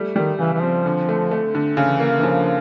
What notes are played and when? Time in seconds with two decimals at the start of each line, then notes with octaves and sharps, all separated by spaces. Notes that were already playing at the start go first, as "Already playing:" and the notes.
Already playing: G3 A3
0.16 D#3 G3
0.39 C#3 E3
0.54 E3
0.62 F3 C4
0.86 D3
1.09 A3
1.31 A3
1.55 D3
1.77 C#3 E3
2.00 A#3
2.18 E3
2.23 C#3 F3